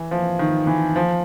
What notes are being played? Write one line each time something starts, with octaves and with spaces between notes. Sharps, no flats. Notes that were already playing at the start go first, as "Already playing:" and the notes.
Already playing: E3
F3
D#3
E3
F3